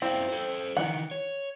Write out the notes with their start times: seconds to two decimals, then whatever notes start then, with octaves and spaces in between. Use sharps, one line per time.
0.02 C4 E4 F4 D5
0.29 A4 C5
0.77 D#3 E3 D#4 F#5
1.11 C#5